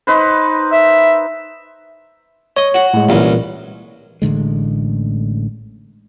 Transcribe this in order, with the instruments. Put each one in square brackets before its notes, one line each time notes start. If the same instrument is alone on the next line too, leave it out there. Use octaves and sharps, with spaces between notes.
[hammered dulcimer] D#4 B4 C5
[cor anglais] E5
[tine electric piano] C#5 [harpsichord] D#5
[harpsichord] F#4
[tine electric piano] A2 G#3
[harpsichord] C2 F#2 [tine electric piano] A#2 E3
[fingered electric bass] A1 A2 D3 G#3